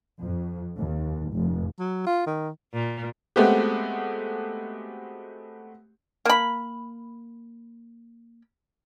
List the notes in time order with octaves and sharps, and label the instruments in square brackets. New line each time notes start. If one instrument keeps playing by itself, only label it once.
[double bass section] F2
D#2
F1
[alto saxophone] F#3
F4
D#3
[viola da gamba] A#2
[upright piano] G#3 A3 B3 C4 F#4 G4
[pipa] A#3 B5